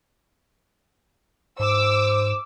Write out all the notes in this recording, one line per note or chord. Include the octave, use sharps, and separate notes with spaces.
G#2 C5 D6 E6